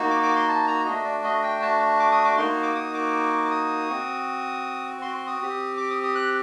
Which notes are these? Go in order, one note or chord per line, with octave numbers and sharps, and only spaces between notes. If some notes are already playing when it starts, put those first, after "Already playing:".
Already playing: A#3 D#4 F#4
D6
D6
C6
A5
A#5
A3 D4 F#4 D#5
D5
D#5
G5
A5
D6
D#6
D6
A#3 D#4 F#4 C6
D6
D#6
D6
D#6
C4 F#4
C6
C6
D#6
C4 G4
D6
D#6
D#6
F#6